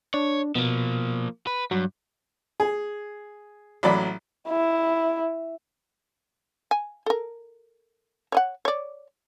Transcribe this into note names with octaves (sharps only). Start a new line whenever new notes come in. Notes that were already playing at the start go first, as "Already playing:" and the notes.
D4 C#5
B2 F3 A#3
B4
G2 F#3
G#4
A1 F#3 D5 B5
E4
G#5
A4 A#4
C#5 D#5 F#5
C#5 D5